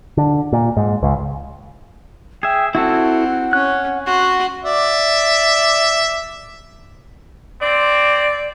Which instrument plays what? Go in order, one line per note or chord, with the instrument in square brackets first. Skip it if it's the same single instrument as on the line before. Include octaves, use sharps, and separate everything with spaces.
[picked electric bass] D3
A#2
G#2
C#2
[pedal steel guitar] G#4 E5 [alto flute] G5
[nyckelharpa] C4 [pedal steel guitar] E4 F#4 A4 [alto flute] F#5
[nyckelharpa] C#4 [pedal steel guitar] F#6
[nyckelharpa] F#4 C6 [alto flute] F#5
[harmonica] D5 E5
[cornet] C4 [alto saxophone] D5